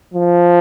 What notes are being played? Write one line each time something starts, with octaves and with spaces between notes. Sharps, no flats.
F3